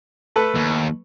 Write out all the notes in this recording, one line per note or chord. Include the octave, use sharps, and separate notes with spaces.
A3 A4 B4
D#2